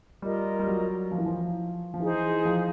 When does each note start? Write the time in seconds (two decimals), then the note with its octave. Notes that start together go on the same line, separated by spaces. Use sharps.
0.22 G3 F4 A#4 D#5
0.59 G3
0.68 F#3
1.12 F3
1.18 E3
1.26 F3
1.94 F3
2.00 E3 D#4 G#4 C5
2.45 F3